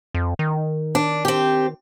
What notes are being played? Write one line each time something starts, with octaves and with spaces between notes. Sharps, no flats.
F2
D#3
D4
C4 G4